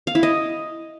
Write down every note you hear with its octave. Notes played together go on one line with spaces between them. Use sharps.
F5
E4
D#5